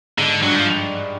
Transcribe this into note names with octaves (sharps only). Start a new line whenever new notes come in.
G#2 D3
G2 F#3
F3